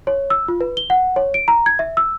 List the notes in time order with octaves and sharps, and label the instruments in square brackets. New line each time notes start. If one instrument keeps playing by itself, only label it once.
[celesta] C#5
E6
F4
B4
G7
F#5
C#5
D7
A#5
G#6
E5
E6